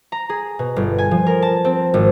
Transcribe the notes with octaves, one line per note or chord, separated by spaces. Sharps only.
A#5
G#4
B2
G1
G#5
F3
A#4
A5
C4
G#1